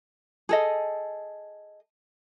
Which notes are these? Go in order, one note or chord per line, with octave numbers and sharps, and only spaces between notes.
G#4 A4 D#5